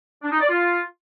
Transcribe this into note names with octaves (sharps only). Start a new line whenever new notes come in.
D4
D#4
D5
F4